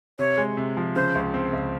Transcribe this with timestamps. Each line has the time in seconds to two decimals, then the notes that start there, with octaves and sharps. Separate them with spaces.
0.19 C3 C#5
0.38 G#3
0.57 C3
0.77 F3
0.95 C#3 C5
1.15 C#2
1.34 C4
1.53 C#2